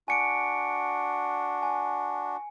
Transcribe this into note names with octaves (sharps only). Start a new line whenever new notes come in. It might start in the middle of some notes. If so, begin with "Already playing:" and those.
D4 F#4 G#5 C#7 D7
G#5